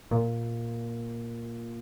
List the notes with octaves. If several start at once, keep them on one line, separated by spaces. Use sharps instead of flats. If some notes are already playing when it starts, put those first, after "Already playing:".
A#2